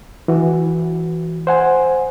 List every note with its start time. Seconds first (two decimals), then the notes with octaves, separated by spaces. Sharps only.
0.28 E3 F#4
1.47 C5 F#5 G#5